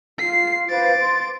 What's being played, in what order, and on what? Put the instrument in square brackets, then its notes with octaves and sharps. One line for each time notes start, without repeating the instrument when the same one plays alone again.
[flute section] F4 [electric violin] C7
[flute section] B4 C5 F5 [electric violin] D6 A6
[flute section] C6